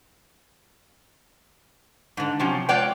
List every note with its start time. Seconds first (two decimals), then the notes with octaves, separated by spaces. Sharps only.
2.17 G#2 D3
2.39 C3 F3 F#3 C#4 G4
2.69 G#3 F4 C#5 D5 F#5 G5